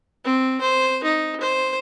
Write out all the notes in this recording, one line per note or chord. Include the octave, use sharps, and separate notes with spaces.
C4
C5
D#4
C5